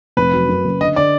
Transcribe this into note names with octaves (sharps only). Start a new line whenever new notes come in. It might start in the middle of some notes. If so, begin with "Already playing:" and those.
F1 B4
F#3
F#2
F#1
D3 D#5
D3 D5